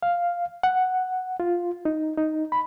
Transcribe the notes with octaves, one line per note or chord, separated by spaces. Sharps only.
F5
F#5
F4
D#4
D#4
B5